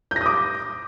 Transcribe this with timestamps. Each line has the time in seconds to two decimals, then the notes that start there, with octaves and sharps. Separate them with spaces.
0.11 G6
0.16 A#6
0.21 D#6
0.26 D6